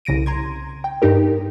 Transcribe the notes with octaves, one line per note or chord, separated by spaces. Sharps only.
C2 C#3 A#6 D7 D#7
A#5 C6 G#6
G5
G2 D#4 G4 A#4